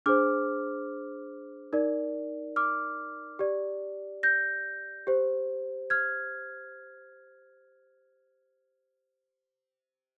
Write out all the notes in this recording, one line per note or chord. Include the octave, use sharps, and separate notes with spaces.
D4 G#4 C5 D6 F6
D#4 A#4 D5
D6 F6
G4 D5
G6 A#6
G4 C5
F6 G#6